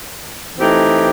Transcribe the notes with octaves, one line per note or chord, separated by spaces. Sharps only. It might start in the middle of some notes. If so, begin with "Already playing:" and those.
E3 A3 C4 D#4 G4